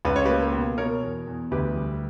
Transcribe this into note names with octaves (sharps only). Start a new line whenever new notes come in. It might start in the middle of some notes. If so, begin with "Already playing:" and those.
C#2 B4
C#5
A#3 G4 B4
B2
B2 A#4 C#5
E2
E2
D2 G4 B4
G3